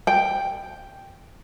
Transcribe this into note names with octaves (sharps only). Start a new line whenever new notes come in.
G5